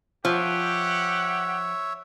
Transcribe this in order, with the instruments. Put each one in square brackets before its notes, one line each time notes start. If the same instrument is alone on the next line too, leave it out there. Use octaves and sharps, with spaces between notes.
[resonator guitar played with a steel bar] F3 [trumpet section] G4 F#5 [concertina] C#5 E5